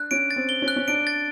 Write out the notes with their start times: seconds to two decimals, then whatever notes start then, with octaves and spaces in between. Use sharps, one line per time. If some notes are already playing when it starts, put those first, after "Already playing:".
Already playing: D4 F#6
0.11 C#4 D7
0.31 A6
0.36 C4
0.49 G7
0.62 C#4
0.68 F#6
0.76 C#4
0.88 D4 D7
1.07 A6